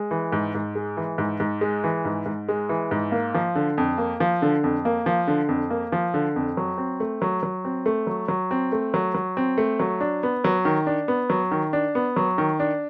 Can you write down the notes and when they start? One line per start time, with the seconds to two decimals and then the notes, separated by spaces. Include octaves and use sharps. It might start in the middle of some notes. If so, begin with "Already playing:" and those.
Already playing: G#3
0.11 E3
0.32 G#2
0.55 G#2
0.75 G#3
0.97 E3
1.18 G#2
1.40 G#2
1.61 G#3
1.84 E3
2.05 G#2
2.26 G#2
2.48 G#3
2.69 E3
2.91 G#2
3.12 A#3
3.35 F3
3.56 D3
3.78 F2
3.98 A#3
4.20 F3
4.42 D3
4.64 F2
4.85 A#3
5.06 F3
5.28 D3
5.49 F2
5.70 A#3
5.92 F3
6.14 D3
6.36 F2
6.57 F#3
6.78 C4
7.00 A3
7.22 F#3
7.43 F#3
7.65 C4
7.86 A3
8.07 F#3
8.28 F#3
8.51 C4
8.72 A3
8.94 F#3
9.15 F#3
9.37 C4
9.58 A3
9.80 F#3
10.01 D4
10.23 B3
10.44 F#3
10.65 D#3
10.87 D4
11.08 B3
11.30 F#3
11.51 D#3
11.73 D4
11.95 B3
12.16 F#3
12.38 D#3
12.60 D4